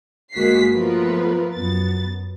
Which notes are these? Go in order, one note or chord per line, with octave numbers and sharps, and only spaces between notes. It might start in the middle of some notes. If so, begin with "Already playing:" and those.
G1 G#3 A#3 F#4 B6 C7
F3 A3 B3 F4 A#4 B4
F#2 B3 A6